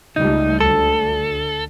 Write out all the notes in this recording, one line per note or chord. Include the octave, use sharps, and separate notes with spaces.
C#2 G3 A3 D#4
D2 A4